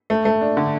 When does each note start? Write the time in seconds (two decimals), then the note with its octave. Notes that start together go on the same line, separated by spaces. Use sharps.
0.10 A3
0.25 A3
0.41 D4
0.57 D3